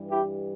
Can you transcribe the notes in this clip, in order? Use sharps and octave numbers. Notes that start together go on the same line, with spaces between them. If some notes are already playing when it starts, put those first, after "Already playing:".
Already playing: G2 E3 G3
E4 G4